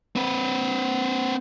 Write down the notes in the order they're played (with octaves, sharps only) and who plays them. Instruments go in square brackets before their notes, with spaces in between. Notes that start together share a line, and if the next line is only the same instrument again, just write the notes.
[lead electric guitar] C4 B4